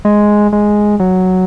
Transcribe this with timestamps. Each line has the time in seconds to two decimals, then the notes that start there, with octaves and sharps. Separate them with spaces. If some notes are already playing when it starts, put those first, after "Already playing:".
0.05 G#3
0.53 G#3
1.00 F#3